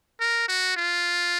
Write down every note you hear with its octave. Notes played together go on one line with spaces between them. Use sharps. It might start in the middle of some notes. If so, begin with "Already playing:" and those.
A#4
F#4
F4